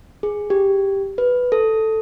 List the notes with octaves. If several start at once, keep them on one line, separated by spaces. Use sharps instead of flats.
G#4
G4
B4
A4